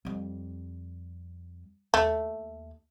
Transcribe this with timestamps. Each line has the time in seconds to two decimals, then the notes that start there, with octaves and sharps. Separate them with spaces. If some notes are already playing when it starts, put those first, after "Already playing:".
0.05 F2 G3
1.94 D#2 A3